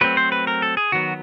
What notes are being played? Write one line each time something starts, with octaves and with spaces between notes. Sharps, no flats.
F#3 A3 C4 B4
C5
B4
A#4
A4
G#4
D#3 F#3 B3 F#4